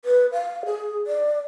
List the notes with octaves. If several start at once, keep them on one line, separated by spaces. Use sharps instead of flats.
B4
F5
G#4
D5